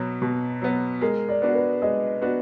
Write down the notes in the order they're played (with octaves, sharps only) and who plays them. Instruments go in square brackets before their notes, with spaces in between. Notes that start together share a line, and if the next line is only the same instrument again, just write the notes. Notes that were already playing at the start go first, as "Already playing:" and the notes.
Already playing: [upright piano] B2 F#3 B3
B2
F#3 B3
[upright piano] G#3 [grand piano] A#4
[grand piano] D5
[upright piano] B3 D4 F#4
[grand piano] B4
[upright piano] G#3 [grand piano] D#5
[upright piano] B3 D4 F#4